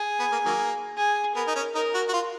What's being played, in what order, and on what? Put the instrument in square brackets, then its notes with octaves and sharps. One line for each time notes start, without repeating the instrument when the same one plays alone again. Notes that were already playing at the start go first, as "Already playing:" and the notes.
Already playing: [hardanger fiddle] G#4
[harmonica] B3
A#3
D#3 F#3 A#3
[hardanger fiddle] G#4
[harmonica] B3 [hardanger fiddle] A#4
[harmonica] D#4
C#4
[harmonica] D#4 [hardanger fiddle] A#4
[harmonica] F#4
F#4
F4